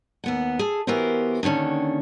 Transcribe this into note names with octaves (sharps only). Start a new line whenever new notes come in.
D#2 B3 F#5
G#4 A4
E3 B3 F#4 G4 A#4 C5
D#2 D3 D#3 C#4 D4